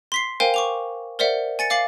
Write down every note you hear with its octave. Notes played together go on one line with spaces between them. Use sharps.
C6 B6 C7
A#4 C5 F5 G5 G#5
C#6 D6 F7
A#4 C5 D5 E5 F#5
G#5 A6 C#7
F5 D6 A6 C7 F#7